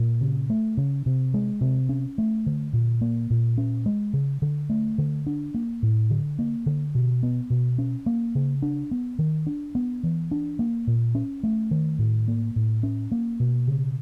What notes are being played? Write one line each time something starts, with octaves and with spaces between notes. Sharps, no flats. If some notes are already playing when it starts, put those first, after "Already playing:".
Already playing: A#2
C#3
A3
C#3
C3
G#3
C3
C#4
A3
D3
A#2
A#3
A#2
C#4
G#3
C#3
D3
A3
D3
D4
A#3
A2
D3
A#3
D3
B2
B3
B2
C#4
A#3
C#3
D4
B3
D#3
D4
B3
E3
D4
A#3
A#2
C#4
A3
D#3
A2
A#3
A2
C#4
A#3
B2
C#3